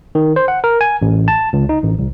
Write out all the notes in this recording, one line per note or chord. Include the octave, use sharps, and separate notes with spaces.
D#3
C5
F#5
A#4
G#5
A1
A5
C#2
D#4
A1
C2